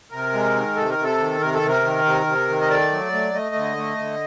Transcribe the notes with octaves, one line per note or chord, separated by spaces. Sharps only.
C3 A#4
G#3
D#3
C3 A4
A#4
C3
A4
D#3
C3 A#4
A4
C3
A#4
D#3
C3
C3
D#3
D#5
A3 D5
F#3
A3
A3 D#5
D3
A3
D3